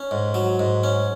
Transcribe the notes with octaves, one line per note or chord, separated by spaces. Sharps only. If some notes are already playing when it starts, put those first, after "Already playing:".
Already playing: C#4
G#2
F#3
G#2
C#4